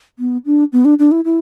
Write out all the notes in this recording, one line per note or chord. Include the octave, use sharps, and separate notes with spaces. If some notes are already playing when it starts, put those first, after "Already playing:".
B3
D4
B3
D4
D4
E4
E4